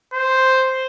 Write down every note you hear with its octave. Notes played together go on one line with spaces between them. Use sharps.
C5